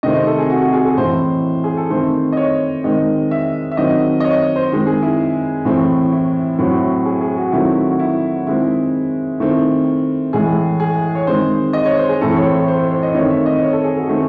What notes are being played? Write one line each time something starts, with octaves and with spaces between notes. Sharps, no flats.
C3 D#3 A3 C4 D#5
C5
A4
G#4
F#4
F#4
G#4
A4
A2 E3 C4 C5
G#4
A4
D#3 A3 C4 C5
D#5
C#5
D#3 G#3 C4 D#5
E5
E5
D#3 F#3 C4 D#5
D#5
C#5
C5
D#3 G#3 C4
G#4
E4
A2 E3 A3 C4
E4
A2 F#3 C4
G#4
G#4
F#4
D#3 F#3 A3 C4 E4
F#4
E4
D#3 G#3 C4 E4
D#3 A3 C4 E4
A2 E3 G#3 G#4
G#4
C#5
D#3 G#3 C4 C5
D#5
C#5
C5
G#4
A2 E3 A3 C4 A4
C#5
C5
A4
C5
C5
C5
D#5
D#3 A3 C4 C#5
E5
D#5
C#5
A4
G#4
F#4
D#3 A3 C4 G#4